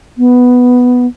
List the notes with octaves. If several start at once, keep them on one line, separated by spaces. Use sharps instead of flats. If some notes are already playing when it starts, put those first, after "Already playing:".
B3